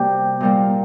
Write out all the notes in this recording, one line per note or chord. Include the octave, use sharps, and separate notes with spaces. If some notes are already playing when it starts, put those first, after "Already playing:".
Already playing: C3 G3 A#3 G4
A#2 G3 A#3